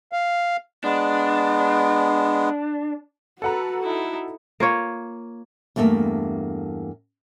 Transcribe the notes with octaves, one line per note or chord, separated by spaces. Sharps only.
F5
G#3 B3 D4
F#4 A4 B4 F#5 A#5
D#4 E4
A#3 F4 C#5
E2 G2 A3 A#3 E5